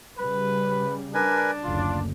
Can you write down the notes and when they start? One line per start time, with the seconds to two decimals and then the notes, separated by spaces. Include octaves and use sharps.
0.18 C#3 G3 B4
1.14 D4 A#4 B4 G#5
1.63 F#1 D2 F4